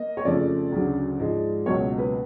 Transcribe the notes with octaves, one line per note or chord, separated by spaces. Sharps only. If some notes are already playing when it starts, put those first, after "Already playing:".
Already playing: A#3 D#5
C#5
F2 C#3 F3 A3 D5
D2 C#3 F#3
G#2 F3 G#3
C#2 B2 F#3 A#3 C#5
B4